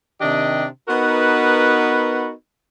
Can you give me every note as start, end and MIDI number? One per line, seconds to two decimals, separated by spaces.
0.21 0.64 48
0.21 0.64 51
0.21 0.64 62
0.21 0.64 67
0.21 0.64 75
0.88 2.30 59
0.88 2.30 63
0.88 2.30 66
0.88 2.30 70
0.88 2.30 71